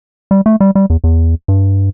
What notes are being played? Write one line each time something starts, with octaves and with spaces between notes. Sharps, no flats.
G3
A3
G3
G3
E2
E2
G2